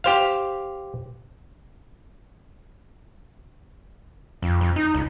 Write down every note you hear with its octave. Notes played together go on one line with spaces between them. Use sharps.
G4 C5 F5
F2
F2
D#4
C#2